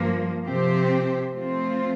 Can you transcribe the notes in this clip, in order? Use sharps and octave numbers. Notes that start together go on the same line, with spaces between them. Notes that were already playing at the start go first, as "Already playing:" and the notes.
Already playing: G2 F3 A#3
C3 F3 C4 G4 C5
F3 A3 C4 F4 C5